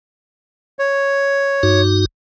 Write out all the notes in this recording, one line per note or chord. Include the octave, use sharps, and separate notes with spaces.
C#5
G2 D#4 F#4